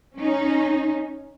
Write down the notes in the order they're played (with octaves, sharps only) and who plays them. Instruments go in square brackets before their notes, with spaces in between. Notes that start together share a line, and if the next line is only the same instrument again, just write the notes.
[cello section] C#4 D#4